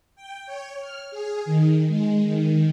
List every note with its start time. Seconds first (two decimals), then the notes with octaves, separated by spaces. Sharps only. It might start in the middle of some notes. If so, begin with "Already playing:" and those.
0.16 G5
0.46 C#5
0.80 F6
1.11 G#4
1.45 D#3
1.88 G#3
2.23 D#3